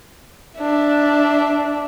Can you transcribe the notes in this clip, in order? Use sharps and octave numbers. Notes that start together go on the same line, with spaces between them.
D4 E5